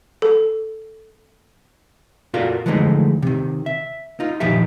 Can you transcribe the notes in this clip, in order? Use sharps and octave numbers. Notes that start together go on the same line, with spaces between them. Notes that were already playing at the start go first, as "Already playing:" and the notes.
A4
F4 F#4 A4 A#4 D5 F5
D3 E3 F3 G#3 A3 D#4
C3 D#3
E5
D#4 F4
A#2 D#3 F3 D#4 G4 E5